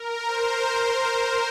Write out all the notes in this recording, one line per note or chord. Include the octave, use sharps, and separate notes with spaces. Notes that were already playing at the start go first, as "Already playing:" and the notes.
Already playing: A#4
C5